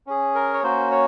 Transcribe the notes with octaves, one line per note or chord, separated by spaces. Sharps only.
C#4 G#4
A#4
C#5
A#3 C#4 F#4 C5
C#5